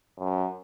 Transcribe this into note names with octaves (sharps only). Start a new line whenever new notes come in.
F#2